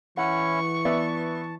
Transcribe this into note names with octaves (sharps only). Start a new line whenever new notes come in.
E3 C#4 E4 F#5 C#6
B3 D5 E5 A5